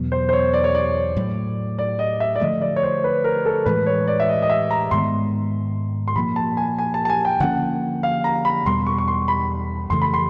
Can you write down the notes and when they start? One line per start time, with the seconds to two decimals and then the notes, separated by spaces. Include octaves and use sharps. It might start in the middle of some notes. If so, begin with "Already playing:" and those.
Already playing: E2 B2 F#3 B3
0.12 C5
0.29 C5
0.33 C#5
0.54 D5
0.64 C#5
0.75 D5
1.17 A2 F#3 A3
1.79 D5
1.99 D#5
2.20 E5
2.36 D5
2.41 D3 F3 A3 D#5
2.62 D5
2.76 C#5
2.83 C5
3.04 B4
3.24 A#4
3.45 A4
3.65 A2 E3 G#3 B4
3.86 C#5
4.07 D5
4.20 E5
4.29 D#5
4.42 D#5
4.50 E5
4.71 A#5
4.91 G#2 D#3 G#3 B3 C6
6.08 C6
6.16 A#2 F3 A#3 B5
6.36 A5
6.57 G#5
6.79 G#5
6.94 A5
7.05 A5
7.10 G#5
7.25 G5
7.40 D3 F3 A#3 C#4 F#5
8.03 F5
8.24 A#5
8.45 B5
8.66 E2 B2 G3 B3 C6
8.87 C#6
8.98 C#6
9.08 C6
9.28 B5
9.90 F2 C#3 E3 A3 C6
10.02 B5
10.14 C6